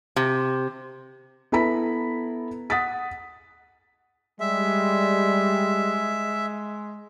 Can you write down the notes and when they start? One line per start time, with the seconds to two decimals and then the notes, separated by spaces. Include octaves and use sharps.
0.16 C3
1.52 B3 E4 A4 A#5 B5 B6
2.70 F#5 D#6 A6 B6
4.40 G3 G#3 E5